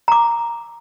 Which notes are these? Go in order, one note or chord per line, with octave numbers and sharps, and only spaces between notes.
A#5 D6